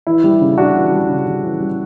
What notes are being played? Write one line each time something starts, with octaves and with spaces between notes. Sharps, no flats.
E3 E4
G3
C#3
C#3 D4 F#4
E3
G3
C#3
C#3
E3
G3